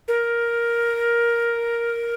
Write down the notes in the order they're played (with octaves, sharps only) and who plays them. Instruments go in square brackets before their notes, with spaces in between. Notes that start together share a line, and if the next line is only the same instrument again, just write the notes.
[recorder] A#4